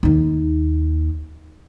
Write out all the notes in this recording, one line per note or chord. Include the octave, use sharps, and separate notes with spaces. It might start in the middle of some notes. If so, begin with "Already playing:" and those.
D#2 D#4